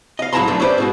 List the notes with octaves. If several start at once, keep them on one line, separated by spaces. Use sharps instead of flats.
D#5 F5
G#2 F#3 E4 A5 A#5 C6
F#2 B2 A3 D4
C#4 E4 G4 B4 C5 D5
G#2 B2 F#4